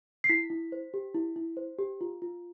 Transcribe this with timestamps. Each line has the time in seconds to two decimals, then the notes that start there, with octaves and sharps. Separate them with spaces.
0.24 C7
0.29 E4 B6
0.50 E4
0.72 C5
0.94 G4
1.15 E4
1.36 E4
1.57 C5
1.79 G4
2.01 F4
2.22 F4